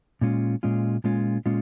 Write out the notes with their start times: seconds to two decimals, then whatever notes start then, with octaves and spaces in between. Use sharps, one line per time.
0.21 A#2 G#3 C#4 F4
0.63 A#2 G#3 C#4 F4
1.04 A#2 G#3 C#4 F4
1.46 A#2 G#3 C#4 F4